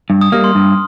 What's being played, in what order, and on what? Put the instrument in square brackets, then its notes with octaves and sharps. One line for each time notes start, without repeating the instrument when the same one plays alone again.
[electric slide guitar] G2
[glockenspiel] D#6
[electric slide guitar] G3 A#3 [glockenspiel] F6
[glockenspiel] C6
[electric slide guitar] G2